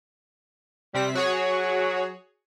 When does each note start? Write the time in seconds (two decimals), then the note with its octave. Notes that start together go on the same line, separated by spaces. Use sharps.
0.94 C3 G3 C4 B6
1.15 F#3 F#4 G#4 C#5